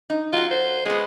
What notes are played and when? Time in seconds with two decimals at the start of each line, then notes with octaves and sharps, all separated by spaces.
0.10 D#4
0.33 F#3 F4 F#4
0.51 C5
0.85 G#3 B3 C5